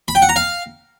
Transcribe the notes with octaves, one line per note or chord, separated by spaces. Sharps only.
B5
G5
F#5
A#5
F5